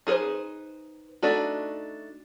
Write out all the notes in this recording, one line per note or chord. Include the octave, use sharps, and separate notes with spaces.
D#4 G#4 A4 B4 C5
A3 D4 D#4 F#4